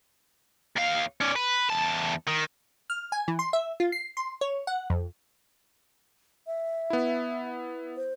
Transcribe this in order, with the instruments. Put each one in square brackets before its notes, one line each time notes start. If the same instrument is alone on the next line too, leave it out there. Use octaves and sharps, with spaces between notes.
[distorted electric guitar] D#2 F5
C#4 D5
B4
E2 A5
D#3
[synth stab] F6
G#5
E3
C6
E5
F4
C7
C6
C#5
F#5
F2
[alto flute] E5
[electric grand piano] B3 E4
[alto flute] C5